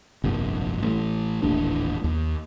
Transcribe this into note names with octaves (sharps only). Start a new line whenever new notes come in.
F1 A#1 G2
A1
D#1 A1 D4
D#2